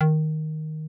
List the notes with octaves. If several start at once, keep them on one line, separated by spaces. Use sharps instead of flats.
D#3